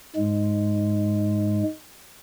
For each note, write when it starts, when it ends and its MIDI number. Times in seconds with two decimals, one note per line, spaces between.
0.16 1.63 44
0.16 1.63 56